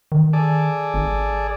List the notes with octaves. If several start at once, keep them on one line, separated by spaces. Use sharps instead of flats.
D#3
G#4 A4 D5
G#1